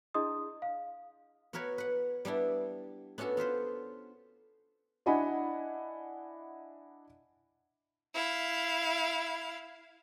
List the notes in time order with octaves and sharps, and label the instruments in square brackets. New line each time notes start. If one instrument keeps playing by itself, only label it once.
[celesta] D4 E4 G#4 D#5 C6 D#6
F5
[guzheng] B3 F#4 A#4 B4 C#5
B4 F#5
G3 B3 D4 E4
B3 C#4 D4 F#4 A4
B3 F4 B4 C5
[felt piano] D4 E4 D#5 F#5 G#5 B5
[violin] E4 F5